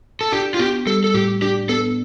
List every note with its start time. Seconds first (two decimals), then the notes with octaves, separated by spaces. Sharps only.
0.21 A4
0.32 D4 G4
0.54 F4
0.59 B3 G4
0.87 G3 A4
1.04 A4
1.14 A2 G4
1.42 D4 G4
1.69 B3 A4